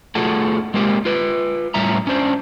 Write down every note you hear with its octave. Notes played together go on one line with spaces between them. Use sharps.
A3 F4 F#4 G#4 A4
G#3 A#3 C4 G4
F4 B4
A2 G3 C#4 E5 A#5
C#4 D4 C5